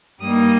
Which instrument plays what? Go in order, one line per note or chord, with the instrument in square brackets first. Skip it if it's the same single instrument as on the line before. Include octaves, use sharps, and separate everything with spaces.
[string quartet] G2 G3 A#3 D#4 D#6